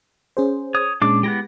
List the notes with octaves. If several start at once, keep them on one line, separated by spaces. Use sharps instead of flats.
C#4 G#4 C5
C#5 D#6
A#2 G#3 C#4 D4 D6
G#3 B3 E4 G4 A#6